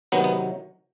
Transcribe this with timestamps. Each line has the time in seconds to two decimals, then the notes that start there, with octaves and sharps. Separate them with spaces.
0.12 C3 D#3 F#3 B3
0.24 B3